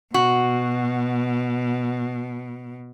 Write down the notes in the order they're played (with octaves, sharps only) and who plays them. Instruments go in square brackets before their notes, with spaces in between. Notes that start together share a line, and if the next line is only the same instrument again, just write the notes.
[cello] B2 [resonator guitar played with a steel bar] F#4